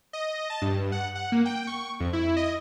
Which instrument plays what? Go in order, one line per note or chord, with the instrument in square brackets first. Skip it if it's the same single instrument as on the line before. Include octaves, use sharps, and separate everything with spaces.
[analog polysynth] D#5
A5
G2
F#5
F#5
A#3
G5
C#6
F2
E4
D#5